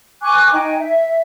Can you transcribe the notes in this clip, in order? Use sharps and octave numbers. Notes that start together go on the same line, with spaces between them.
G#5 C#6 D6 F#6
D#4 D#5 G5 G#5
E5